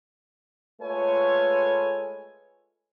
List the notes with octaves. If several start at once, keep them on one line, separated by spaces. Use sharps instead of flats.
G#3 A3 F4 B4 C#5 G#5